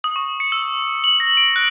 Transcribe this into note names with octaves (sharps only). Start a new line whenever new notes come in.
D#6
C#6
C#7
E6
F#7
A#6
D7
F#6